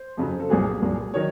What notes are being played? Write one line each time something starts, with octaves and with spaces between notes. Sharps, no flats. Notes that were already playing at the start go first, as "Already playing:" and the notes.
Already playing: C5
F2 C#3 F#3
A4
C2 A#2 F#3 G#4
C2 A#2 F#3
D#3 F#3 C#5